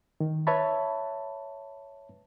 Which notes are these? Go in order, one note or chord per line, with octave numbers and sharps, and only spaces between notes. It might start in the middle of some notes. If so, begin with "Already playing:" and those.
D#3
B4 C#5 E5 A5 B5